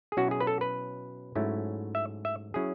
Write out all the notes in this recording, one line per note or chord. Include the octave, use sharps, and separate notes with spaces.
G#4
B2 F#3 C#4 E4 F#4
G#4
B4
A4
B4
G#2 F#3 A3 C#4 E4
E5
E5
F#3 C#4 E4 G#4